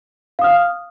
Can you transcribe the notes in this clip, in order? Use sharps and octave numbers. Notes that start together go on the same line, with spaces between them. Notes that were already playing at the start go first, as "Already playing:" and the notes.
F5 D#6 F6